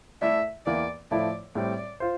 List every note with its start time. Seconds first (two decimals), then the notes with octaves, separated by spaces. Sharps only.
0.22 A3 E4 A4 D5 E5
0.66 E2 E3 A#3 D5
1.11 A2 F3 A3 E4 D5
1.55 A2 G3 C4 D5
2.00 F4 C5